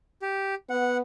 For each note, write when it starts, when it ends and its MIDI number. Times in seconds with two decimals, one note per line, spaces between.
0.22 0.55 67
0.70 1.01 59
0.70 0.97 78